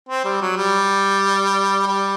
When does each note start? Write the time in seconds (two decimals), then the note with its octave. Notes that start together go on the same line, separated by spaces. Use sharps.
0.09 C4
0.25 G3
0.41 F#3
0.57 G3
1.87 G3